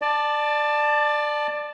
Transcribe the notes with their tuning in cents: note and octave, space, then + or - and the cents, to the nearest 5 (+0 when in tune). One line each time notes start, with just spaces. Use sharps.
D5 +20 A5 +0